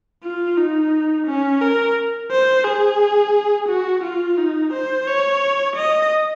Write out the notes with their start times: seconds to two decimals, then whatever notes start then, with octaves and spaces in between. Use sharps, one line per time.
0.24 F4
0.57 D#4
1.27 C#4
1.62 A#4
2.31 C5
2.65 G#4
3.68 F#4
4.03 F4
4.38 D#4
4.73 C5
5.07 C#5
5.76 D#5